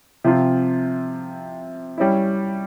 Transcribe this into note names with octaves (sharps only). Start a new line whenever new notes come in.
C3 F3 C4 F4
G3 C#4 E4